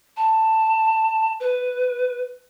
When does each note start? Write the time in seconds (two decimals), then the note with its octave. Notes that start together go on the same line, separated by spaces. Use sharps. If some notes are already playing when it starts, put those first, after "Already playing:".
0.17 A5
1.40 B4